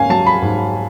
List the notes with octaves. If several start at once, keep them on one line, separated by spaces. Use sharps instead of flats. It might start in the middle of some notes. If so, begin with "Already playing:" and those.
Already playing: G#2 C#4 F5 G#5
F#3 A5
B5
G#2